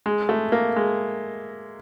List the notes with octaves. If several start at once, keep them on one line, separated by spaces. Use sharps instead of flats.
G#3
A3
A#3
G#3